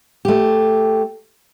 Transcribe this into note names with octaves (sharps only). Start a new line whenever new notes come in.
A3 G4